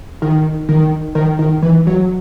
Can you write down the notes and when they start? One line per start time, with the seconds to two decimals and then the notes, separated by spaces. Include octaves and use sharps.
0.22 D#3
0.69 D#3
1.15 D#3
1.39 D#3
1.62 E3
1.87 F#3